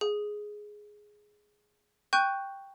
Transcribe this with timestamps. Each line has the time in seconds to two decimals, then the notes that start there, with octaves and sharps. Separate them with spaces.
0.01 G#4
2.13 G5 C#6 F#6 G6 D#7